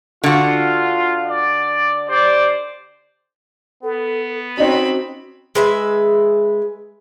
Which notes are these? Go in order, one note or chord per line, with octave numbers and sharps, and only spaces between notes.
D3 F4 F#4
D5
G4 C5 D5
B3 A4
C4 C#4 D#4 F#4 C#5 B5
G#3 B4 E5